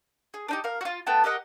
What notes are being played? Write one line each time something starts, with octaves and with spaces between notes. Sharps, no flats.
G#4
D4 D#4 G4
A#4 F5
F4 F#4
A3 B3 G5 A5
G4 A#4 D#5 F#5